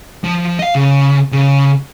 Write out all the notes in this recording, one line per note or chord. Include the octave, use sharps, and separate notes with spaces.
F3
D#5 F5
C#3
C#3